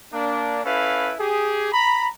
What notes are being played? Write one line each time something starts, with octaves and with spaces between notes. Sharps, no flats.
A#3 D4
C#4 E4 A4 B4 F5
G4 G#4
A#5 B5